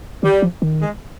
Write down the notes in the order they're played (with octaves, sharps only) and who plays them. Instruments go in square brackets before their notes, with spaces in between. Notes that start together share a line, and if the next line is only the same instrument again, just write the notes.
[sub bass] D#3 [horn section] G3
[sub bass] F3
D#3
[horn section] G#3